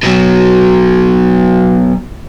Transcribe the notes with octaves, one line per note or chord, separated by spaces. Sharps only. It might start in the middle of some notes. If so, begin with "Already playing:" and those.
B2 F#3